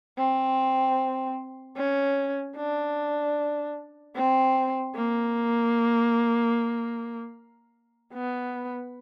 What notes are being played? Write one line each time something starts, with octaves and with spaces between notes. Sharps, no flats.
C4
C#4
D4
C4
A#3
B3